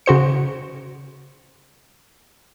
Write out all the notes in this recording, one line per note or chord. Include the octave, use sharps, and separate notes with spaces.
C#3 F#4 C5 C#7